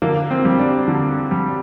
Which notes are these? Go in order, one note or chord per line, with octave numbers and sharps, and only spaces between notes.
D3 A#3
C4
G3
D4
D3
G3